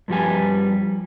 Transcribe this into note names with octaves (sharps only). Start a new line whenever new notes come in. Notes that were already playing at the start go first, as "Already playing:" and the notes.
G2 F3 G3 G#5